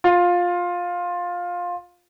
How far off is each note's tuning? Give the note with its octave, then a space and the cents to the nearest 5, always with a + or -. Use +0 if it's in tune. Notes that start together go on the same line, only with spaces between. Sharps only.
F4 +15